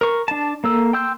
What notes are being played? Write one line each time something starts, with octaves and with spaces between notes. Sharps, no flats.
A#4 C#6
D4 A5
A#3 A4 E6
G5 C6 E6 G6